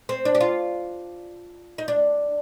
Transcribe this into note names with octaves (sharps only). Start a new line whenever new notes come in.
C4
D4
G4
F4
D#4
D4